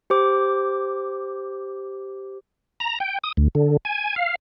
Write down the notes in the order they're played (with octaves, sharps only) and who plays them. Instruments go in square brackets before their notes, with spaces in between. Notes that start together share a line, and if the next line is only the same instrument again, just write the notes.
[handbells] G4 C5 D6
[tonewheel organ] A#5
G5
D#6
D2
D3
G#5
F5